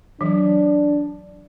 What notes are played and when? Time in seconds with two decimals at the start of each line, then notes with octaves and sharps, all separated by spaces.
0.21 E3 F#3 D4